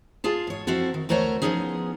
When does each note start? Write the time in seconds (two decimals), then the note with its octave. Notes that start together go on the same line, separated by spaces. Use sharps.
0.24 F4 G#4 A5
0.47 G#2 C#5
0.67 F3 C4 E4 F#4 A4
0.94 D#3
1.09 D2 A3 A#4 C5 C#5 F#5
1.42 F3 G3 B3 C#4 D#4 G#4